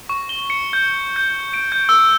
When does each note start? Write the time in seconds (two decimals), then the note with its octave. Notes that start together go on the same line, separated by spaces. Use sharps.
0.09 C#6
0.29 G7
0.50 C#7
0.73 G6
1.16 G6
1.54 D7
1.72 G6
1.89 E6